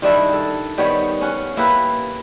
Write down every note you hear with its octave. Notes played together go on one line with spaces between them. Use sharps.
D#3 G3 D4 E4
A4
D#3 G3 B3 C#5
C#4 F#5
A#3 E4 G4 B4